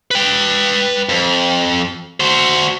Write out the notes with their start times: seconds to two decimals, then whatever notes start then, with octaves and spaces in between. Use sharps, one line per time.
0.11 B4 G5
1.09 F2
2.20 F#4 C5